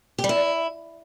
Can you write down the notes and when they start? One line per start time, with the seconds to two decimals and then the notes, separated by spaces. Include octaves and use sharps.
0.18 G4
0.24 G3
0.29 E4